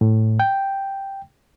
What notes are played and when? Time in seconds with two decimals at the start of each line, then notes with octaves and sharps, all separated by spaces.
0.01 A2
0.40 G5